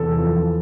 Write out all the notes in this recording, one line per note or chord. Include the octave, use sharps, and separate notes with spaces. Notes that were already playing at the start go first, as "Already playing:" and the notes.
Already playing: E2 C3 A4
F3